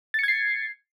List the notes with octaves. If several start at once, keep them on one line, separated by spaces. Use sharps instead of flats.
G#6 A6 C7 C#7